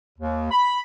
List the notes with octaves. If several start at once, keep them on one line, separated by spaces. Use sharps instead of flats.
D#2
B5